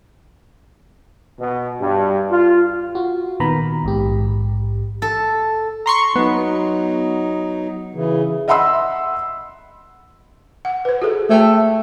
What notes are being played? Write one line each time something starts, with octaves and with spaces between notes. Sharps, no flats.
B2
G2
F4
F4 F#4
A#2 D#3 B3 A#5 B5
A#1 G#2 G4
A4
A#5 C6 C#6
F#3 B3 D#4
C#3 E3
D#5 E5 F#5 B5 C6 E6
F#5
B4 C5
F#4 G#4 A4
A3 C5 G5 A5